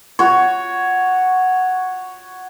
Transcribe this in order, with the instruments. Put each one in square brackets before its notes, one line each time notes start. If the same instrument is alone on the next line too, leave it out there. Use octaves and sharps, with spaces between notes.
[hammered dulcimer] F#4 C#5